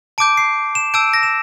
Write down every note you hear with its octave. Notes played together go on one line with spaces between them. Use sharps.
A5 D6 G6 D7
C7
E7
A5 E6 G6 D7
A#6
E7